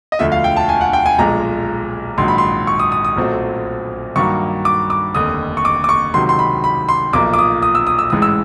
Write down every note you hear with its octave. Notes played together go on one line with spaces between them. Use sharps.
D#5
E1 D2 D3 F3 A3 E5
F5
G5
A5
G#5
F#5
G5
G#5
B1 A#2 F3 G#3 A#5
A#1 G#2 D#3 F#3 C6
B5
C6
C#6
D#6
D#6
D#6
B1 A#2 F#3 A3 C4
G2 D#3 F#3 A#3 C#6
D6
D6
F1 D#2 D3 D#6
C#6
D6
D6
C#6
C#2 C3 D#3 F#3 C6
C6
B5
B5
C6
B1 A#2 F3 A#3 D6
D6
D#6
D#6
E6
D#6
E6
A1 G#2 E3 G#3 D#6
E6